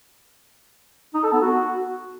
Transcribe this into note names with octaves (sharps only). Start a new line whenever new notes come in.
D#4
A4
B3
F#4